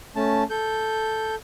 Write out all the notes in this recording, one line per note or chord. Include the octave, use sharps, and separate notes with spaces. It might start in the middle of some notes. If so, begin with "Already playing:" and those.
A3 C#4 A5
A4 G6